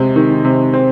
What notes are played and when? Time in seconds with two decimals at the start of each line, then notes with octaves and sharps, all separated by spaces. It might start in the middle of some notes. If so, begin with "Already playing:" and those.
Already playing: C3 G#3
0.16 D#3
0.45 C3
0.74 C4